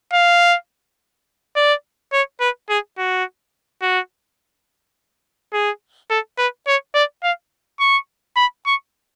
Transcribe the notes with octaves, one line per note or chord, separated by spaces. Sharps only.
F5
D5
C#5
B4
G#4
F#4
F#4
G#4
A4
B4
C#5
D5
F5
C#6
B5
C#6